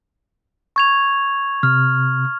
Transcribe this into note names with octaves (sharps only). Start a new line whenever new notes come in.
C#6 G#6 F7
C3 F6